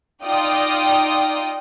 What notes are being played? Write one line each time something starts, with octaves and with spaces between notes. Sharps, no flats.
D#4 F4 D5 G5 D#6